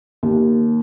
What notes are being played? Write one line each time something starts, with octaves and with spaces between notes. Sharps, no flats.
D#2